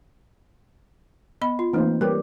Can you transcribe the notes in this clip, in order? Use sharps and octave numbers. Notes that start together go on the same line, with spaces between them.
B3 D#5 B5
F4
E3 A3 A#3 C4 D#4 C5
G3 G4 A#4 B4 C#5